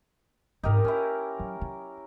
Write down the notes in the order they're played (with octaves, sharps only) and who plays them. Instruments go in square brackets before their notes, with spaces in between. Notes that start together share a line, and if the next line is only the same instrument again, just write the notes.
[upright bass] G#2 F#3 [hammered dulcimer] D#4 G4 A#4
[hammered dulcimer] C#4 E4 [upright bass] F4
[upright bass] F#3
F#3